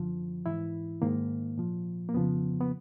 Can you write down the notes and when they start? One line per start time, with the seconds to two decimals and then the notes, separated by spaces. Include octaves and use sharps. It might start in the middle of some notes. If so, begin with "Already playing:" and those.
Already playing: F#2 D3 F3
0.46 G#2 E3 E4
1.02 G#2 D#3 A#3
1.58 A#2 F3
2.09 A#3
2.14 F2 C#3 F3 B3
2.61 B3